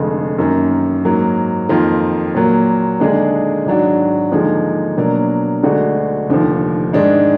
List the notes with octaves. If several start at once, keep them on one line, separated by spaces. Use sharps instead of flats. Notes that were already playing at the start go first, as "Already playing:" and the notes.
Already playing: F1 F2 D3 G#3
F#2 D#3 A#3
G#2 F#3 A#3
F2 D#3 A#3 F4
A#2 F#3 A#3
D#2 D3 G#3 D4 G#4
G#1 G#2 F#3 D4 F#4
D#2 D3 F3 G#3 D#4
B2 F#3 A#3 D4
D2 D3 G#3 D4 F#4
F1 D#2 D3 F3
G#2 D#3 G#3 D4